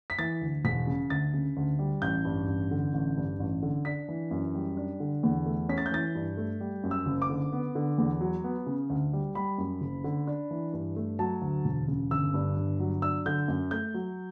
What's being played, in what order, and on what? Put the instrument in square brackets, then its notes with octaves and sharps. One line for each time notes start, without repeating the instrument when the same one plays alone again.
[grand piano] B6
E3 A6
D2
E1 B6
C#3
D2 A6
C#3
D2
G3
A1 G6
G2
A1
D3
A1
G2
A1
D3
D4 B6
E3
F#2
G3
D4
D3
E2
A3
C#4 B6
A6
G6
E3 A6
G2
A3
G3
F#2
E6
F#1
D6
D3
B3
D3
E2
F#3
B3
C#3
D2
G3
G3 B5
F#2
F#1
D3
D4
E3
G2
A3
F#3 A5
D2
E1
C#3
G1 E6
G2
G1
F#3
D4 E6
D3 G6
F#2
A3 G6
F#3